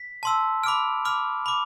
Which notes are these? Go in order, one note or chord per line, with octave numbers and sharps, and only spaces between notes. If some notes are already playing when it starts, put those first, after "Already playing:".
Already playing: B6
A5 C6 E6
B5 D6 F6 D7
B5 D6 F6
B5 D6